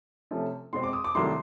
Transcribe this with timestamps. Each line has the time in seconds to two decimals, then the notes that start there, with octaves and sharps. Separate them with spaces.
0.31 C3 F3 A3 C#4
0.73 B2 G#3 C4 C6
0.83 D6
0.93 D#6
1.04 D6
1.15 C2 C3 D#3 F#3 A3 C6